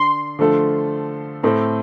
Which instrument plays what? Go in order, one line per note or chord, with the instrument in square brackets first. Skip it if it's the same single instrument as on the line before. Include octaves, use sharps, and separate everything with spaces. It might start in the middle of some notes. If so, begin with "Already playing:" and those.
Already playing: [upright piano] D3 D4 [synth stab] C6
[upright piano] D3 F3 A3 F4 A4
A2 A3 C4 A4